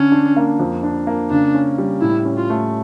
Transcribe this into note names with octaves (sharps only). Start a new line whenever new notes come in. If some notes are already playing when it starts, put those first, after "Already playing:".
Already playing: D3 C#4
D4
A#3
F2
D4
A#3
C#3 D4
C#4
G3
A2 E4
C#4
F4
A3